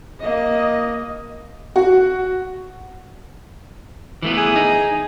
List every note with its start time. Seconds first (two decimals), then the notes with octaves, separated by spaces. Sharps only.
0.21 A#3 D#5
1.76 F#4
4.22 E3 A3 B3
4.37 G#4
4.56 D#4